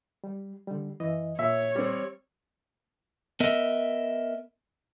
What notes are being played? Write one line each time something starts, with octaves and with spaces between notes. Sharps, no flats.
G3
D3 G3
F#2 E3 D#5
A#2 C#5 E5
G3 C4
B3 A#4 D#5 E5